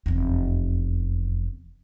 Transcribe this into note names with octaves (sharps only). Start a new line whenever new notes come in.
F1 E2